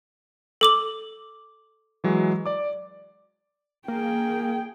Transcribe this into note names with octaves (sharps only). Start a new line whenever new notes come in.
A4 D6 F#7
E3 F#3 G#3
D5 D6
A#3 G#4 G5